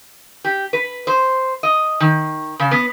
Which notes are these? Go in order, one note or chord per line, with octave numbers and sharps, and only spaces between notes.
G4
B4
C5
D#5
D#3
C#3
B3